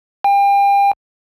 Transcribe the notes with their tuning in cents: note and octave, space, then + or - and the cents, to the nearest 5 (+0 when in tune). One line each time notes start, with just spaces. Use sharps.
G5 +35